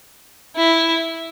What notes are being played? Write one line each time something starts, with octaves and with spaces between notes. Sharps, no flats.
E4